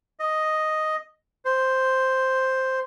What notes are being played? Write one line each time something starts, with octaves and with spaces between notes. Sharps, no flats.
D#5
C5